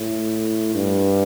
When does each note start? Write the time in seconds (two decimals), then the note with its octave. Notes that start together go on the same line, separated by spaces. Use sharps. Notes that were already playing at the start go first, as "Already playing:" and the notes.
Already playing: A2
0.75 G2